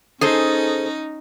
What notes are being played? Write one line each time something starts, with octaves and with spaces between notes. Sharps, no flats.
C#4 D#4 G#4 A4 C5